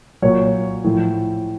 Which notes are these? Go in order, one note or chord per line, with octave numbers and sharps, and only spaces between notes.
A#2 F#3 C#5
A2 F3